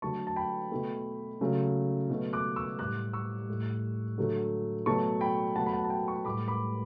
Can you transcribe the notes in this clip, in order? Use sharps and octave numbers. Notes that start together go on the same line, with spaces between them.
D3 F#3 A3 A5 C#6
A5
G5 B5
B2 A3
C#3 F#3 A3
B2 F#3 A3
D6 F#6
C#6 E6
A2 G3 D6 F#6
C#6 E6
A2 G3
D3 F#3 A3
B2 F#3 A3 A5 C#6
G5 B5
B2 F#3 A3 F#5 A5
B5
F#5 A5
A5
G5 B5
A5 C#6
A2 G3 B5 D6
B5 D6